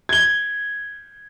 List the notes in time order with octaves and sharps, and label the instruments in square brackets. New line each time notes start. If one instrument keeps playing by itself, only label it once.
[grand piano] G#6 G7